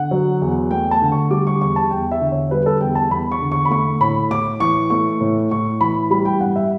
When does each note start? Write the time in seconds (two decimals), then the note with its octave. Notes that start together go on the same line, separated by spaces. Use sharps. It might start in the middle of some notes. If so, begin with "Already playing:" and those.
Already playing: D3 F#5
0.11 F#3
0.42 E2
0.71 A3 G5
0.91 A5
1.02 D3
1.12 C#6
1.31 G3 D6
1.47 C#6
1.61 E2 C#6
1.76 A5
1.91 E2 G5
2.12 E5
2.21 D3
2.32 C#5
2.51 G3 B4
2.66 A4
2.80 E2 G5
2.95 A5
3.11 E2 B5
3.32 C#6
3.41 D3
3.52 C#6
3.65 B5
3.70 A3 C#6
4.01 A2 B5
4.31 A2 D6
4.60 E3 C#6
4.90 A3 C#6
5.21 A2
5.51 A2 C#6
5.80 E3 B5
6.10 G3 B5
6.25 G5
6.41 G2 F#5
6.56 E5